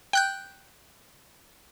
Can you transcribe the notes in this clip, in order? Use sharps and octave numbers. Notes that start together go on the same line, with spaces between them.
G5 F#6 G6